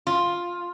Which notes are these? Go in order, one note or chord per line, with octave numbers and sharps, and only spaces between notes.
F4